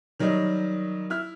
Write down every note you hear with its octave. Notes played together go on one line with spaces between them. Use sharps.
D#3 F#3 G3 A#4 D#5
E4 E5 F6